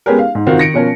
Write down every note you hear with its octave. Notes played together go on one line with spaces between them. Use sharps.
G#3 B3 C#4 G4 G#4 A#4
F5
G#2
D#3 C4 F4 F#4
D#3 A#6 C#7 D7
B2 F3 C#4 A#4